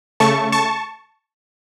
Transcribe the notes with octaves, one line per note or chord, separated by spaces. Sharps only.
C#3 A3 A5 C#6
A5 C#6